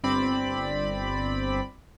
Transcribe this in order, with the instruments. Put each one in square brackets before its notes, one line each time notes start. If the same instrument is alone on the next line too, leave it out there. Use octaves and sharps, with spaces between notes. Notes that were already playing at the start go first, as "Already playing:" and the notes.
[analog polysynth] G1 C4 D5 B5